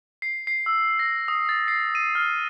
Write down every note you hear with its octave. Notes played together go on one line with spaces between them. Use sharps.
C7
C7
E6
A#6
D#6
A6
C7
D#7
F6